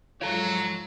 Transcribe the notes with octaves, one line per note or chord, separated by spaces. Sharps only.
G#2 F#3 F4 F#4 A4 C#5 A#5